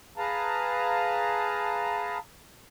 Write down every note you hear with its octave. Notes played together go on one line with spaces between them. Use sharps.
G#4 B4 F5 A5 A#5